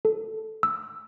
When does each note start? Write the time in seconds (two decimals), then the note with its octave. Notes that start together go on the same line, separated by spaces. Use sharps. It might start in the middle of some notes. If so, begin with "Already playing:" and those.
0.05 A4
0.63 E6